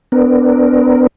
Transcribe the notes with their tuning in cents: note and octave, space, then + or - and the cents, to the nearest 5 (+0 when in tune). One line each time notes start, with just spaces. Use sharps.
B3 +30 D4 +0 A#4 +0